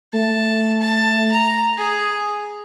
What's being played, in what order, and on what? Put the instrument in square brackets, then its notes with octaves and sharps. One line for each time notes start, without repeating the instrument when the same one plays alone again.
[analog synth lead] A3 [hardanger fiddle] A5
[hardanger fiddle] A5
A#5
[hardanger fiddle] G#4 [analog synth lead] D#6